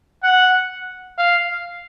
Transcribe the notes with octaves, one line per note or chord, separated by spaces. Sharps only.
F#5
F5